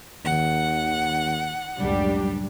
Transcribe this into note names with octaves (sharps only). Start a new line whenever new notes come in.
D#2 D#3 F#5
C#2 F#2 A2 G3 D4 G4